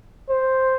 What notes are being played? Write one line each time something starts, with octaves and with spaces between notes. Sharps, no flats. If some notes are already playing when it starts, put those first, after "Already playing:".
C5